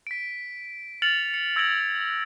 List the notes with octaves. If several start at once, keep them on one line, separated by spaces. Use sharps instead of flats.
B6 D7
F6 A6 C#7 F7 F#7
C#7
E6 G#6 A#6 D7 F7 F#7